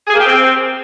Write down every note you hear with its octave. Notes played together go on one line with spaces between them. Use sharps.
G#4
A#3
G4
C4